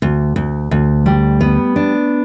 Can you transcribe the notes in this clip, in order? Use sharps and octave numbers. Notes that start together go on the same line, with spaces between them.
D2
D2
D2
G3
B3
D4